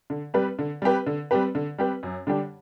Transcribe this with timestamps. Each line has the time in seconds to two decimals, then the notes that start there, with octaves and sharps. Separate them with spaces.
0.10 D3
0.34 G3 C4 G4 B4
0.59 D3
0.82 G3 C4 G4 B4
1.07 D3
1.31 G3 C4 G4 B4
1.55 D3
1.78 G3 C4 G4 B4
2.03 F#2
2.27 D3 G3 D4 G4